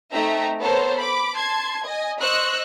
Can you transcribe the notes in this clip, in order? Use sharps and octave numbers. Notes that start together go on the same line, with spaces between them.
A3 C4 D#4 E5 G5 A#5
B3 A4 A#4 C5 C#5
B5 D6
A5 C6 G#6
D#5 G#5
C5 D#5 C#6 E6 F#6